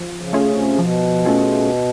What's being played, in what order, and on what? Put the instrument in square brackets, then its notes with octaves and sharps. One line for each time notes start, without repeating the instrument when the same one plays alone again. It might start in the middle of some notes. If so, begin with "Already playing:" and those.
Already playing: [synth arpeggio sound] F3
[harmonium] C#3
[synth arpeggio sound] A3 C#4 F4 G#4
[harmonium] C3
[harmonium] B2 [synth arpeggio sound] F3
[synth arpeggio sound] A3 C#4 F4 G#4